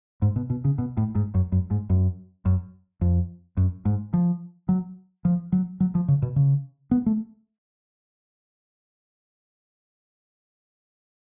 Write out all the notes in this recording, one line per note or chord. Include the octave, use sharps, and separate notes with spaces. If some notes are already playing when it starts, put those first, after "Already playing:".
G#2
B2
B2
C#3
B2
A2
G#2
F#2
F#2
G#2
F#2
F#2
F2
F#2
G#2
F3
F#3
F3
F#3
F#3
F3
C#3
B2
C#3
B3
A3